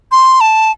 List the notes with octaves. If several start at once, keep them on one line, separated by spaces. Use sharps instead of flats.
C6
A5